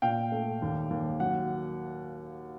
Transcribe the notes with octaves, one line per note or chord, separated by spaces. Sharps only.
A#2 F5 G5
A3
D#2
D#2
F#3 F#5